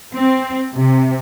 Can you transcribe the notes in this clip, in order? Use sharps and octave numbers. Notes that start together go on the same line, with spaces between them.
C4
C3